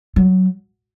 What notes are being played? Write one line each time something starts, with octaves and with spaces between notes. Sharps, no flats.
F#3